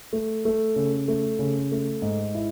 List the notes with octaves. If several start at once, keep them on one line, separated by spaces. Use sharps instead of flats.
A3
A3
C#3
A3
C#3
A3
G#2
E4